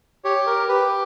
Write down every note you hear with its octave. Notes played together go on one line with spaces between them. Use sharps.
G4 C#5
A#4
G4 B4